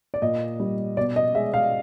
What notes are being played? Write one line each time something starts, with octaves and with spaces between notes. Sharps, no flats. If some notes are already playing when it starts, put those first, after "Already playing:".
D5
A#2 D#5
G3
B2 D5
D#5
G#3 E5
F5